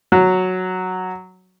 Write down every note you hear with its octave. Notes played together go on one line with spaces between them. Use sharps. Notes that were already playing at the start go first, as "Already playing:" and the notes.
F#3